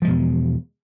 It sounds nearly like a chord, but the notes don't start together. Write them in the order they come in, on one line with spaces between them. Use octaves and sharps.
F3 G#3 B2 E2